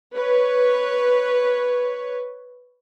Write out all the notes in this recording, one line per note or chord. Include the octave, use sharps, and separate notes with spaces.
B4 C#5